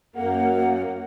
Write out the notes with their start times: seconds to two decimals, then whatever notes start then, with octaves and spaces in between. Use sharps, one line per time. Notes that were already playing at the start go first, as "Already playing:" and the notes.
0.16 F#2 A#3 F#5